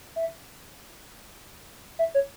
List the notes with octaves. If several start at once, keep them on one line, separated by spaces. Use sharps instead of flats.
E5
E5
C#5